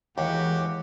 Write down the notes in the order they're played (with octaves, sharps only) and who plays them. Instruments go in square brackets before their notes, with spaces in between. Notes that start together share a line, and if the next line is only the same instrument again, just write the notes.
[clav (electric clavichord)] D#2 [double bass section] E3 G#3 [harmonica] F#4 G4